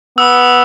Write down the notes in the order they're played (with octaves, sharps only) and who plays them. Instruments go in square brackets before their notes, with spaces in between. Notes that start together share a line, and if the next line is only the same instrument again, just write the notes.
[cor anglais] B3 [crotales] E6